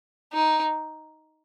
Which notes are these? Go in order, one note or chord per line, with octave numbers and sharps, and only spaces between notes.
D#4